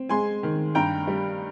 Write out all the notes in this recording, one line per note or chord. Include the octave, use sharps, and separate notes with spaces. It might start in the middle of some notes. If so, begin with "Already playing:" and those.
Already playing: C4
G#3 G#5 C6
D#3
G2 G5 A#5
G3